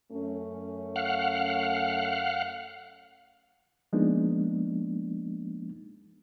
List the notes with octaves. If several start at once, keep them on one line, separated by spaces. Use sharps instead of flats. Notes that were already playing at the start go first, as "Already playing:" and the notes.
F#2 A3 C#4
F5 F#5
F3 G#3 A#3 B3 D4 D#4